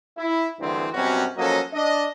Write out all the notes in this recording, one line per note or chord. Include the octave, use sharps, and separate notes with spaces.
E4
D2 G2 D3 E3 G#3 C4
F#2 B2 G3 C4 C#4 F#4
F3 F#3 A#3 C#4 A4 D#5
D4 D#5